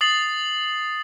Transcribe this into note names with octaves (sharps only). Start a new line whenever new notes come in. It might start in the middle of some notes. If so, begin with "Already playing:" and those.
D#6 A6 C7 F#7